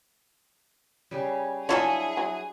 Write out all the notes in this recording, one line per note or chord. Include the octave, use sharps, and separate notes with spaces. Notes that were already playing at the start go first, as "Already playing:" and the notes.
C#3 G3
F#3 D4 E4 F4 G#4 A4 C#5 D#5
F#3